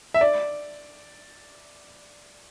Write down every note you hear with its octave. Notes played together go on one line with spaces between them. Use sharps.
E5
D5